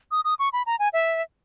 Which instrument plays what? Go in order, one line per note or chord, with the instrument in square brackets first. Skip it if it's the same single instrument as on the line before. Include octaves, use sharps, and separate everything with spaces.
[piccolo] D#6
D#6
C#6
B5
A#5
G#5
E5